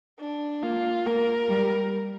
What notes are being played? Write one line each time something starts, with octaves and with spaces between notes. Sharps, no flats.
D4
A#3 F4
A#3 A#4
G3